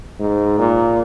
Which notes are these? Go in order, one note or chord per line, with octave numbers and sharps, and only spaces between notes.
G#2
A#2